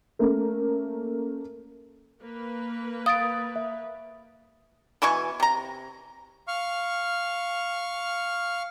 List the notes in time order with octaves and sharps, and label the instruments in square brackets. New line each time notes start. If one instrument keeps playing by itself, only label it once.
[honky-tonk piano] A3 A#3 C#4
[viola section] A#3 B4
[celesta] F5 A6 D7 [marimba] D#6
[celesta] E5
[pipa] B2 E3 G#5 C#6
C3 A#5
[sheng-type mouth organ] F5 C#6 F6